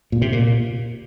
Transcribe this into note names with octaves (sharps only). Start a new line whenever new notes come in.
A#2
C3
A#2